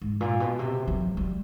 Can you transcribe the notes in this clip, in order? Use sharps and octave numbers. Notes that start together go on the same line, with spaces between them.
G#2
A#2
B2
C3
F#3
G3